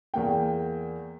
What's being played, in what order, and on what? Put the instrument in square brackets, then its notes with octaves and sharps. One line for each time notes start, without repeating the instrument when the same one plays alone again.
[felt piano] E2 A#3 G5